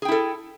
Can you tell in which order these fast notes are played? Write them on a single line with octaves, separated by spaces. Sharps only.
G#4 G5 E4 A4